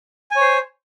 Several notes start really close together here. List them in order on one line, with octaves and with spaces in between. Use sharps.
G#5 C#5 C5